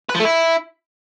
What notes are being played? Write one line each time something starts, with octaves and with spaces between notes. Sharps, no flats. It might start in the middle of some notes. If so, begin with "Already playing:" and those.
B4
F3
A3
E4